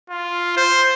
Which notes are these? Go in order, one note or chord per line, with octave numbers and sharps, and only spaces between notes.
F4
C5